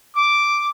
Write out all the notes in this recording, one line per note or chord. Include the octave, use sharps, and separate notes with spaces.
D6